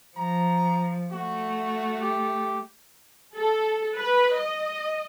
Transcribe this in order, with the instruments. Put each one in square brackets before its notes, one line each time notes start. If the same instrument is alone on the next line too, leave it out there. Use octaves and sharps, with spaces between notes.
[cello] F3 [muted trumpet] A#5
[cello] A3 [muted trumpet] F#4
[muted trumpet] G4
[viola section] A4
B4
D#5